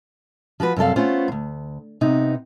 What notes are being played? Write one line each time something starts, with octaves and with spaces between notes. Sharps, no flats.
F3 F#4 A4 B4
F#2 C3 G3 A4 F5
A3 B3 C#4 F4 C5
D2 G2
C3 B3 D#4